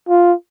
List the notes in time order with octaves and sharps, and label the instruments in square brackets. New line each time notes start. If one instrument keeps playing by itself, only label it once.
[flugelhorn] F4